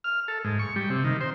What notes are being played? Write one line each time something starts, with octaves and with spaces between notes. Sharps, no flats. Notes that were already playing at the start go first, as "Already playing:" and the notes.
F6
A4
G#2
C#6
G3
C3
D#3
C5